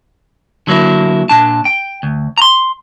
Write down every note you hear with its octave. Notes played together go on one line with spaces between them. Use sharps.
D3 F#3 A#3 E4
A#2 D4 A5
G5
D2
A#5 C6